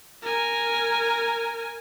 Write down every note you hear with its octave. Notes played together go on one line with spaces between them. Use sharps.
A#4 G#5